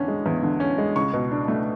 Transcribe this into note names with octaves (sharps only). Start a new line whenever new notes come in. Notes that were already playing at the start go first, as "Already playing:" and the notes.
Already playing: E2 D3 C#4
G#3
E2
D3
C#4
G#3
C#2 C#6
B2
D4
A3